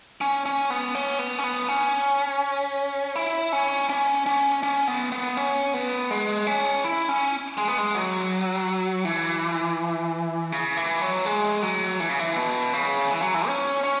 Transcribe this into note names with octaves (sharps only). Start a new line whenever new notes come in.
C#4
C#4
B3
C#4
B3
C#4
B3
C#4
E4
C#4
C#4
C#4
C#4
B3
B3
C#4
B3
G#3
C#4
E4
C#4
G#3
B3
G#3
F#3
E3
C#3
E3
F#3
G#3
F#3
E3
C#3
E3
B2
C#3
E3
F#3
E3
C#4
C#4